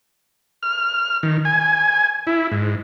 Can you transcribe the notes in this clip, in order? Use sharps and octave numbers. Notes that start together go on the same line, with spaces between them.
F6
D#3
G#5
E4
G#2